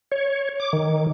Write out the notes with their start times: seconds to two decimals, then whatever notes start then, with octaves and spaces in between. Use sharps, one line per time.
0.12 C#5
0.60 D6
0.73 D#3